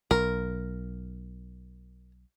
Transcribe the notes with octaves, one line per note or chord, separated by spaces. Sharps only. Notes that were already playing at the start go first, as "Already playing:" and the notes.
B1 A#4